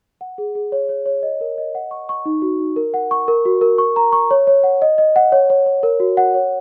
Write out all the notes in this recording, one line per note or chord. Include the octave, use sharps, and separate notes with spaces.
F#5
G#4
G#4
C#5
C#5
C#5
D#5
A#4
D#5
F#5
C#6
C#6
D#4
F#4
D#4
A#4
F#5
C#6
A#4
F#4
A#4
C#6
A#5
C#6
C#5
C#5
F#5
D#5
D#5
F#5
C#5
C#5
C#5
A#4
F#4
F#5
C#5